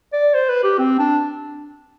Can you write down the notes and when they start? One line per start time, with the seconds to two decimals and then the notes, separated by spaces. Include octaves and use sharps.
0.13 D5
0.34 C5
0.49 B4
0.63 G4
0.78 C4
0.99 D4